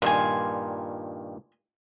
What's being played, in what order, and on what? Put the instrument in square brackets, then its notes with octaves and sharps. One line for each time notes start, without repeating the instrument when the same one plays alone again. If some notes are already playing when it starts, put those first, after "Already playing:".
[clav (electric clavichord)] G2 A#2 D#3 [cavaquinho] G#5 C6